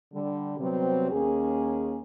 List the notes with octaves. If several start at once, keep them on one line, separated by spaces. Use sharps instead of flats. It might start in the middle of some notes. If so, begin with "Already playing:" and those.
D3 G3
C3 F#3 G3 B3 C4
D#2 A#3 C#4 G#4